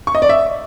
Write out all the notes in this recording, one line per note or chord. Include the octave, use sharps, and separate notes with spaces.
C#6
D#5
D5
E5